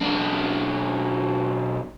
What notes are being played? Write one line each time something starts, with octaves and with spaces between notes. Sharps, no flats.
B1 D4